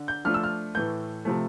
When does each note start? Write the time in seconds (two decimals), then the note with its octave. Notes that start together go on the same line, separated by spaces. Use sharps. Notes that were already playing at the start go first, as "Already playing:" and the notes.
Already playing: D3
0.08 G6
0.25 F3 A3 D4 F4 F6
0.34 E6
0.43 F6
0.75 A2 E3 A3 G6
1.25 C3 F3 A3